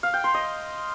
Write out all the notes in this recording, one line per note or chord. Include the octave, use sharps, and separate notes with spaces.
F5
G5
C6
D#5